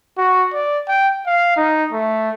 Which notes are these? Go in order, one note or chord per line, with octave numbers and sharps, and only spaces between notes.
F#4
D5
G5
F5
D#4
A3